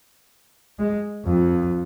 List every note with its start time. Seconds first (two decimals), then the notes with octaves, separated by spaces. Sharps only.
0.79 G#3
1.25 F2